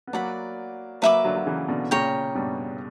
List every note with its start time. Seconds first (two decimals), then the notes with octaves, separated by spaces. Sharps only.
0.07 B3
0.13 F#3 A#3 D5 F#5 B5
1.02 F#3 A#3 B4 E5 B5 D6
1.24 D3 F#3
1.36 F#3
1.46 C#3 E3
1.68 B2 D3
1.91 A#2 C#3 C#5 G5 A#5
2.35 G2 B2